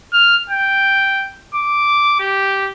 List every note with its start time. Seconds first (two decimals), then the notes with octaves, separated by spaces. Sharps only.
0.14 F6
0.50 G5
1.55 D6
2.20 G4